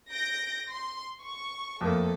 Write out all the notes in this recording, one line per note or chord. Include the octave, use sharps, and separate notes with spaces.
G6 A#6 D7
C6
C#6
F2 A3 A#3 A4